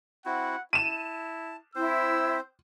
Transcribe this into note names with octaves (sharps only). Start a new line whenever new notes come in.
C4 E4 F#4 F#5
E4 A5 D#7 E7
C4 E4 C5 E6